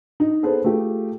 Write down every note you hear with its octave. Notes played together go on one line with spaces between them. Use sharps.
D#4
B3 G#4 A4 B4 C5
A3 F4 G4 G#4